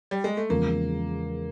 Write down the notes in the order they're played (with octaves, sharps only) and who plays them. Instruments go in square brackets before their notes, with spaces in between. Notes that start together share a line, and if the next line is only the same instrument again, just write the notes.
[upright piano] G3
G#3
A3
[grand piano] E2 C#3 F3 G#3 [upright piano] A#3